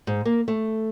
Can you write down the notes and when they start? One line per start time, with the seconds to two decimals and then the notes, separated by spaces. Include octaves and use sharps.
0.07 G#2
0.25 A#3
0.48 A3